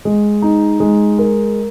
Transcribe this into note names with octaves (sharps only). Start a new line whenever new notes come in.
G#3
D#4
G#3
A#4